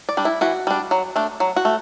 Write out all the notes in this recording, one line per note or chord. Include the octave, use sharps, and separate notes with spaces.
D5
G3 D4
E4
E3 F#4
G3 D4
F#3
A3 D4
F#3
F#4
A3